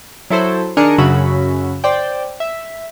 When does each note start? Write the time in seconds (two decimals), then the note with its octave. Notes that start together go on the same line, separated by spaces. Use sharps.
0.30 F#3 E4 A4 C5
0.77 D#3 D4 G#4 A#4 C#7 D#7
0.98 F#2 C#3 F#4 B5 E6
1.84 C5 D5 G5
2.40 E5